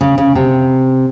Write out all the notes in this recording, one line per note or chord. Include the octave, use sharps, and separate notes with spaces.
C#3
C#3
C3